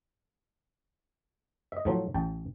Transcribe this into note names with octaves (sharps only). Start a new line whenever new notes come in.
D#5 E5
A2 F3 F#3
A1 G5 A5